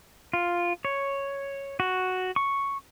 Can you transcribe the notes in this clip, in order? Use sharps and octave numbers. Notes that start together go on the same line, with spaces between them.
F4
C#5
F#4
C#6